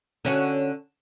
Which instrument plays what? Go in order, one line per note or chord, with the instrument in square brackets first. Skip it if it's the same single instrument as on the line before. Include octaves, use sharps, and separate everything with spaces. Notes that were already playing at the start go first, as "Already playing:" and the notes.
[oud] D3 C#4 F#4